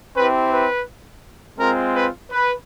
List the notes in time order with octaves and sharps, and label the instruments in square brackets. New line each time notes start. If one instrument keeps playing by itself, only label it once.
[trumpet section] C4 E4 G4 B4
B4
G#3 C4 F4 A#4
B4
B4